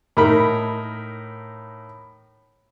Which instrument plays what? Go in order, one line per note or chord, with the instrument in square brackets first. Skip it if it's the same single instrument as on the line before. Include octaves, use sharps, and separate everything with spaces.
[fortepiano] A2 D#4 A#4 B5